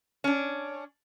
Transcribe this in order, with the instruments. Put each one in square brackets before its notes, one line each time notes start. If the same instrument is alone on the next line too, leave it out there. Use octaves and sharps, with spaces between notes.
[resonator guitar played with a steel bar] C#4 D4